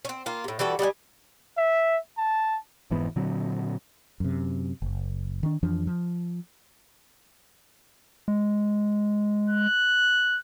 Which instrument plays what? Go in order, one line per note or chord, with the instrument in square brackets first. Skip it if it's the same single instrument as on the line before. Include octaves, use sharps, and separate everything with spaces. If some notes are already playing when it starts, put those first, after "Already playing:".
[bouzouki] C4 C#4
A#3 F4
A2 C3
E3 G3 F#4 A4
G3 D#5 F#5 G#5
[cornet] E5
A5
[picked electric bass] F1 G#2 E3 B3
A#2 D3 F#3 C4
[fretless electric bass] F#2 C3
F#1
D#3 D4
F2 E3 F3 D4
F3
[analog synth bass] G#3
[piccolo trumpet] F#6